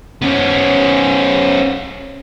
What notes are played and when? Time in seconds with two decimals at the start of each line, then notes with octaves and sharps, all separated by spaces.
0.22 B3 C#4